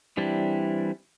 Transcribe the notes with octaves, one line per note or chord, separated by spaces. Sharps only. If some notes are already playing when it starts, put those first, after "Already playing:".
E3 G3 C4 D4 E4